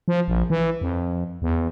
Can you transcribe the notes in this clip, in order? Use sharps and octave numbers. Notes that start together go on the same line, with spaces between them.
F3
A#1
E3
F2
E2